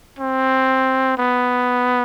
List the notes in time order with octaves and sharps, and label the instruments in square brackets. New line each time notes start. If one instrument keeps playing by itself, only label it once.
[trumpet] C4
B3